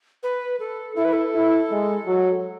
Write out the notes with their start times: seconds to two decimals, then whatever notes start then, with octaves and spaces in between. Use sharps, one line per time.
0.23 B4
0.60 A4
0.96 E4 A4
1.05 B4
1.13 A4
1.34 E4
1.70 G#3
2.06 F#3